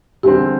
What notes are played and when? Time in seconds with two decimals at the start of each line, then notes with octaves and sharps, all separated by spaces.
0.23 E2 D3 G3 C4 G4